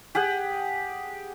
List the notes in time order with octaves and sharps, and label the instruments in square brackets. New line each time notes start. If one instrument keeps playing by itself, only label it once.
[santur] G4 G#4 F#5